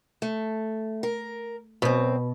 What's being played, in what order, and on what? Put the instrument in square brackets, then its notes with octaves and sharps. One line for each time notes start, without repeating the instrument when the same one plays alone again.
[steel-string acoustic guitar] A3
A#4
[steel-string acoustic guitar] F#2 C4 [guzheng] B2